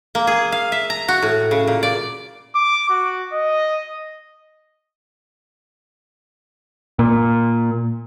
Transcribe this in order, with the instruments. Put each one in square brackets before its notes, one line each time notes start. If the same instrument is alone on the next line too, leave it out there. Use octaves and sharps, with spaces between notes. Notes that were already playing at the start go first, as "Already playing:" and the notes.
[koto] A#3
G#4
F5
E5
A#5
F#4
A2
C#3
A#2
D5
[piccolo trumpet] D6
F#4
D#5
[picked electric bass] A#2